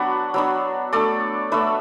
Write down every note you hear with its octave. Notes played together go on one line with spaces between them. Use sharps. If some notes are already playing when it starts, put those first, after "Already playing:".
Already playing: F#3 B3 D4 F#4 B4
F#3 B3 D4
A3 D4 A4 D5
A3 D4 B4 E5